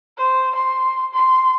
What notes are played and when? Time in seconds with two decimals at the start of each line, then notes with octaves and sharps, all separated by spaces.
0.18 C5
0.55 C6
1.13 C6